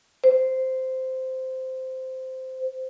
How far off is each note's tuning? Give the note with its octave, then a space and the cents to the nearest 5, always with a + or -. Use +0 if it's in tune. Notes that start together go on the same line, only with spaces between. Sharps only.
C5 -10